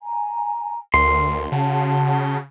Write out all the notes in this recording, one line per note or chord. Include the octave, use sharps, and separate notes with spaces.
G#5 A#5
D2 A#4 C6
C#3 F#4 F#5 A5